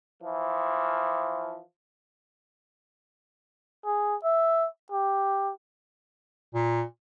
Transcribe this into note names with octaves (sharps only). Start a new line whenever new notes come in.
E3 F3
G#4
E5
G4
A#2